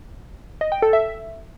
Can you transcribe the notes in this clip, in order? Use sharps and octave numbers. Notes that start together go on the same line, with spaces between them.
D#5
G5
A4
E5